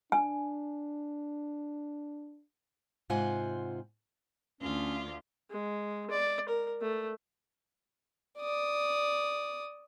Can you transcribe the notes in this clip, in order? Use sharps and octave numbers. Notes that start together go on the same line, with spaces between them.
D4 G#5
G#2 C3 F4 C5 F#5 G#5
D2 C#4 F4 D5
G#3
D5
A#4
A3
D5 D#6